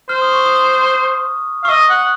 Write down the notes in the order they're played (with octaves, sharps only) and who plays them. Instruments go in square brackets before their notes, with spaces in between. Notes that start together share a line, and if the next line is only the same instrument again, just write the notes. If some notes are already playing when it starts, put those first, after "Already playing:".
[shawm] C5 [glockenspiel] F6
[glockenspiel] D#6
C#6
D#6
[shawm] F5 [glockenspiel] C#6
[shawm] D#5 [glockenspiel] D#6
[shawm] F#5